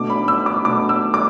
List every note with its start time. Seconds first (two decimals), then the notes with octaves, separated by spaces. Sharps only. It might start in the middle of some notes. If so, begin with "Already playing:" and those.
Already playing: B2 A3 D4 D6
0.10 B5
0.28 E6
0.46 D6
0.65 B2 A3 D4 D6
0.89 E6
1.14 D6